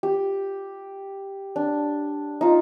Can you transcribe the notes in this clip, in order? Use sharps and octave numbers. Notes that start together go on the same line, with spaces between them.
G4
D4
D#4 F4